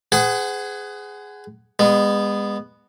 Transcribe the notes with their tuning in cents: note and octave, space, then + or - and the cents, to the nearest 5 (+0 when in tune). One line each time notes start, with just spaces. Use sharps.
G#4 +0 C5 -45 F#5 +20
G#3 -35 B3 +0